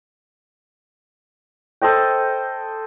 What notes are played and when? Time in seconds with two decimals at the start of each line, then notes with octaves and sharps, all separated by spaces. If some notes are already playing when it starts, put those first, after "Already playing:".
1.82 A4 C5 D#5 G5